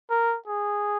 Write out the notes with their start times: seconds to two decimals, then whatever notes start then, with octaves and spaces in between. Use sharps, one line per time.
0.10 A#4
0.48 G#4